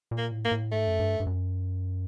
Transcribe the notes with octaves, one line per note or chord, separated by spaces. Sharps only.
A#2
A#3
A2
A#3
A2
G#2 A3
F#2
G2
G2
F#2